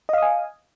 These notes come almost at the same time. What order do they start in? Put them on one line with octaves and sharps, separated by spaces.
D#5 F5 D#6 G#5